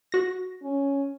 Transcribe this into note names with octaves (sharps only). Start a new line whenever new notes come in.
F#4 A#6
C#4